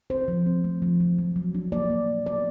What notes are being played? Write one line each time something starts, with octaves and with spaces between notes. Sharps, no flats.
C4 C5
F3
C4
A3
F3
F3
F#3
F#3
D4
A#3 D5
A#3
F#3
B3 D5